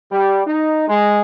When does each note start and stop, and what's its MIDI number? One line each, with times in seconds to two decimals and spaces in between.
0.11 0.42 55
0.45 0.85 63
0.88 1.20 56